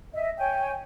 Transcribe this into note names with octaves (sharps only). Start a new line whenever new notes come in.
D#5 E5
C#5 G5 G#5